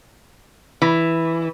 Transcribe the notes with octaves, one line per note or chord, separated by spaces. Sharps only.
E3